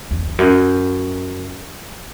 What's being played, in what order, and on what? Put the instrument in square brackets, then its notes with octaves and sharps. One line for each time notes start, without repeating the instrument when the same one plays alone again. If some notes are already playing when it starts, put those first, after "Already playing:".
[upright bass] E2
E2
F#2